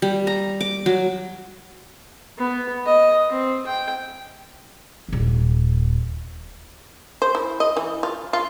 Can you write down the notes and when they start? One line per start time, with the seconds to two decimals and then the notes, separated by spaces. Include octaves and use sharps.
0.02 G3
0.27 A#5
0.61 D6
0.86 F#3
2.38 B3
2.86 D#5
3.30 C4
3.66 G5
5.08 D#1 D#2
7.22 C5
7.35 E4
7.60 D#5
7.77 E3
8.03 F4
8.33 F4